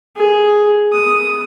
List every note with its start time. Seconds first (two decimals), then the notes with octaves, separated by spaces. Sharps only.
0.16 G#4
0.92 D#6